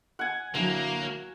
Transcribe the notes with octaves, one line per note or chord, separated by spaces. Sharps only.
F#5 G#5
D3 F#3 A#3 E4